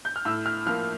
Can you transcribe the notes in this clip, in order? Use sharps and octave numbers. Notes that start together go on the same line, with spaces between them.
G6
F6
A2 E6
F6
F3 A#3 F6